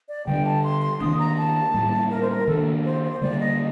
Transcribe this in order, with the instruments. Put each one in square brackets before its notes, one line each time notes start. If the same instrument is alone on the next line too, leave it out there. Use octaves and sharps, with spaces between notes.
[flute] D5
[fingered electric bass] D3 G3 D4 [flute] G5
[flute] A5
C6
C6
[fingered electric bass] D#3 A#3 D4 [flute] D#6
[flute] A#5
A5
[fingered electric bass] A2 G3 A#3
[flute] A#4
C5
A#4
[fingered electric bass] D#3 A#3 D4 [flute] A4
[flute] C5
C5
[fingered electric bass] D3 G3 A#3 [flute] D5
[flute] D#5